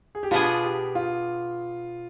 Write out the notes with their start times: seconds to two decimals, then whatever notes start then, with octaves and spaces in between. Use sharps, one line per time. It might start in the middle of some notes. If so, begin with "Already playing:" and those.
0.15 G#4
0.23 G4
0.31 B2 B3 D4 F4 G#4
0.64 G4
0.95 F4